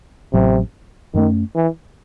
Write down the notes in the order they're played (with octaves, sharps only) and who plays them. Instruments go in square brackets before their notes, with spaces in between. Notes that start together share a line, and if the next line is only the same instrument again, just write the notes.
[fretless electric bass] A1 A2 F#3 [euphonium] C3
[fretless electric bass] F#2 E3 [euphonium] D#3
[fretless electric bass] A3 C#4
[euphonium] E3